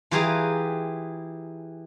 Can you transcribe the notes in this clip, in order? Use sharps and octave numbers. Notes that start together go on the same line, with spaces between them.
E3 F4 G4 G#4 B4 A#5